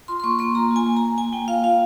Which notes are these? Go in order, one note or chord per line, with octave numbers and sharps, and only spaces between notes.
F4 C6
C6
A#3 C#6
A#3 C6
F4 A#5
F4 G#5
A#3
A#5
A#3
A#3 G#5
A#3 G5
F4 F5
F4 F5